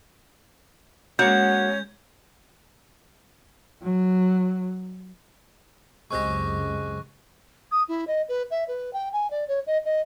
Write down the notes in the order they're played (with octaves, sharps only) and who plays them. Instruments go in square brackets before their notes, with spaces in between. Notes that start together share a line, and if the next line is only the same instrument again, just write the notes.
[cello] G#3 C#4 [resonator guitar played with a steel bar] A#3 F#4 F#5 [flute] C#5 [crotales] G6
[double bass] F#3
[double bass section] C#2 F#2 [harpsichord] G#3 C4 G4 [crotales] C#6 F#6 A#6
[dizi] D#6
E4
D#5
B4
E5
B4
G5
G#5
D5
C#5
D#5
D#5